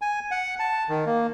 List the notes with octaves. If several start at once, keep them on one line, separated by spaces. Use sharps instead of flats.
G#5
F#5
A5
D#3
A#3